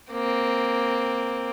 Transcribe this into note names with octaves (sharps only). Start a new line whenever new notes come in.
A#3 C4